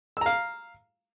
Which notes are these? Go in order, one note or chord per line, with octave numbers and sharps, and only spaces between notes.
F5 A#5 E6